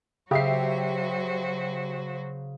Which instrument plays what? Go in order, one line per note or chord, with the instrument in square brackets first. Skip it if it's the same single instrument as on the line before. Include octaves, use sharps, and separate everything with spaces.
[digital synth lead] C#3 [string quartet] F#3 F#4 C5 [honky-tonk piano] G4 E5 C7